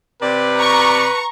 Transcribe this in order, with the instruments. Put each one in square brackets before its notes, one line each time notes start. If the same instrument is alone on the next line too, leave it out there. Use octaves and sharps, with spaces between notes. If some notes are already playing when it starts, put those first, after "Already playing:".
[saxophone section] C3 D5 [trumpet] B4
[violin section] A#5 C#6